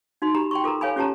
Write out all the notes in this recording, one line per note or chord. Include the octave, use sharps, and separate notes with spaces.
D#4 F#4 C6
G4 A#5 B5
G5 C6 C#6
F4 A4 A#4 A#5
A4 C#5 F5 G#5 B5
C#4 F4 G4 C#5 A5 A#5